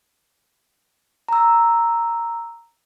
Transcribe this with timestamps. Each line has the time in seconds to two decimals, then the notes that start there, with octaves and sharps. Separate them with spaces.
1.28 A#5 E6